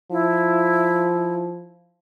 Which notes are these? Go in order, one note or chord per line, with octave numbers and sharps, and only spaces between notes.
F3 E4